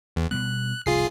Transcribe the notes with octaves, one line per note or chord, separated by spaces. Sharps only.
E2
B2 G3 B3 F#6
F1 C2 F4 G#4 C7